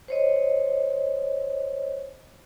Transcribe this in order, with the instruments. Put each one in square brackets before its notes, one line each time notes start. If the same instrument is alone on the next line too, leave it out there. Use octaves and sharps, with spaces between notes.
[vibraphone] C5 C#5 D#5